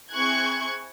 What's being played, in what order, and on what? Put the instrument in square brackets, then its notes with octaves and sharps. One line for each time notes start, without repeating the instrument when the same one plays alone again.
[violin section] C4 E4 G#4 C#6 F#6 G#6